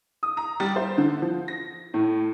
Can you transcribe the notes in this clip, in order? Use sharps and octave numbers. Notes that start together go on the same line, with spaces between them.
D#6
A#5
G3
C5
D3
F3
A#6
A2